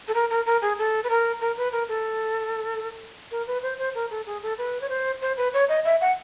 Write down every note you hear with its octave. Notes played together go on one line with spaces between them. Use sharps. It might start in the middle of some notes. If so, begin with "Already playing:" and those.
A4
A#4
A#4
A#4
G#4
A4
B4
A#4
A#4
B4
A#4
A4
A#4
B4
C5
C5
A#4
A4
G#4
A4
B4
C#5
C5
C5
B4
C#5
D#5
E5
F#5